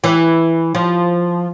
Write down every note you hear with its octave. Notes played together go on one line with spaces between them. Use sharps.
E3
F3